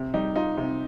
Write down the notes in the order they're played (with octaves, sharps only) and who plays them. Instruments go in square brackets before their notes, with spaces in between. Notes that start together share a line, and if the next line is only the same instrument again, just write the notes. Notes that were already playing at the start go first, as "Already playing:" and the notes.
Already playing: [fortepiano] C3
[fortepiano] G3 [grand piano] D#4
[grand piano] D#4 [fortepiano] F4
[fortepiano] C3